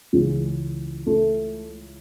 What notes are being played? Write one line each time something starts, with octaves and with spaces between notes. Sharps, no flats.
C#2 C#3 E3 G#3
A3